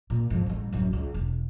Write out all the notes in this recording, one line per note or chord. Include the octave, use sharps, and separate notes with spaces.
A#2
F2 G#2
A1 G3
D1 F#2
C#2
E1